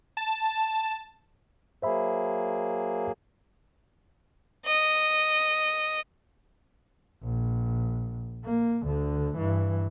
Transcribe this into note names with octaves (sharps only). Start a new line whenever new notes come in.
A5
F#3 A#3 G#4 C5 E5 B5
D#5
A#1
A#3
D2 D3
G2 E3